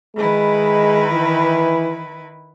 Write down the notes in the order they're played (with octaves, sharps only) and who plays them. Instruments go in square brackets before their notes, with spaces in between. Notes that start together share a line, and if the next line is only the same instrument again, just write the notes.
[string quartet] D#3 E4 B4 [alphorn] G#3
[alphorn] E3